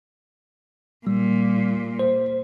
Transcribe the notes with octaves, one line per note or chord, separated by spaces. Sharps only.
A#2 G3
C5